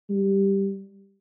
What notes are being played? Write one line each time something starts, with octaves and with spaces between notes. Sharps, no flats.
G3